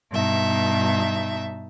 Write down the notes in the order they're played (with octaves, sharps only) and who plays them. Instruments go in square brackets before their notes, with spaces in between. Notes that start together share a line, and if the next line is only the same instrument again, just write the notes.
[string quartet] G2 B2 D#4 E5 A5